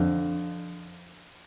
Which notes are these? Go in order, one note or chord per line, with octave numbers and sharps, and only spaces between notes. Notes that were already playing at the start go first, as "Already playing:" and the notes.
Already playing: F2 D3